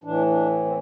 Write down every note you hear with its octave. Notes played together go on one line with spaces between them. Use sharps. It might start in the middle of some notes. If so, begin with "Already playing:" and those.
A2 E3 D4
D4
C4